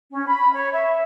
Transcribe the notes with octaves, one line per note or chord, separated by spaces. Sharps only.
C#4
B5
C#5
E5